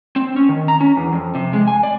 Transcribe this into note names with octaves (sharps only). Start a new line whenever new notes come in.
C4
C#4
D#3
A#5
C#4
E2
F2
C3
G#3
G#5
D5